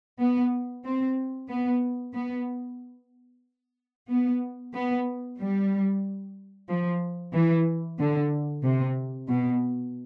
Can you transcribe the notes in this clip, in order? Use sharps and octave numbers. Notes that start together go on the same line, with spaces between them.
B3
C4
B3
B3
B3
B3
G3
F3
E3
D3
C3
B2